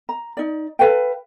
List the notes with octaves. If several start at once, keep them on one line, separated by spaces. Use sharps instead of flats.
A#5
D#4 D5
A4 B4 F5 G5